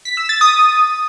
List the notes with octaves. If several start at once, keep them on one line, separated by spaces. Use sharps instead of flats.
B6
E6
A6
D#6